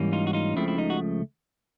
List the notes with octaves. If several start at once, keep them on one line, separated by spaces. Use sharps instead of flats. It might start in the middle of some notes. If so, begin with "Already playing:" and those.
Already playing: G#2 E3 G3 A#3 C#4
D#4 F4
F#4
D#4 F4
C#2 C#3 F3 A3 C4 E4
E4
D#4
F#4